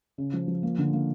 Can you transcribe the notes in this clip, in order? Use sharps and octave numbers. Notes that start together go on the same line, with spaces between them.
C#3
F3
F3
A#3
D3
A#3